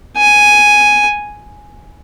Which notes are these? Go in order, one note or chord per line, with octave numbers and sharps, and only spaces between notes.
G#5